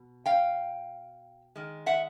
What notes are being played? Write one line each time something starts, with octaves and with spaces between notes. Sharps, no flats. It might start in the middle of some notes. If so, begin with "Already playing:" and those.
Already playing: B2
F5 G5
D#3 G#3
E5 F#5